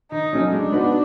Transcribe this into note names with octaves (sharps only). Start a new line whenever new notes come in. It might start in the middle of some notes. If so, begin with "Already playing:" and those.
D#3 D#4
F#3 A3 C#4
G#3 D4
B3 D#4 F#4 B4